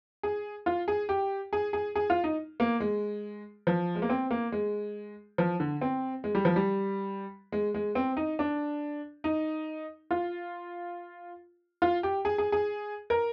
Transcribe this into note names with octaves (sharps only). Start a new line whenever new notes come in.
G#4
F4
G#4
G4
G#4
G#4
G#4
F4
D#4
A#3
G#3
F3
G#3
A#3
C4
A#3
G#3
F3
D3
C4
G#3
G3
F3
G3
G#3
G#3
C4
D#4
D4
D#4
F4
F4
G4
G#4
G#4
G#4
A#4